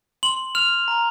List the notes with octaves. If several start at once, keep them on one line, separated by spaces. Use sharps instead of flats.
C6 F#7
F6 F7
A#5